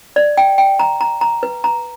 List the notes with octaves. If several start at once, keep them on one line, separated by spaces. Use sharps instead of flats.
D5
G5
G5
A#5
A#5
A#5
B4
A#5